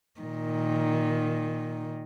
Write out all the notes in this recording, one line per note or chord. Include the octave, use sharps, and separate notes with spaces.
A#2 D#3